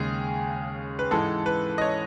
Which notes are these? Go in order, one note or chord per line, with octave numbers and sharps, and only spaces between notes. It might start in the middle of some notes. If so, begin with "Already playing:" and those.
Already playing: D#2 C#3 G#3 G#4
B4
G#2 E3 G#3 A4
B4
D#5
C#5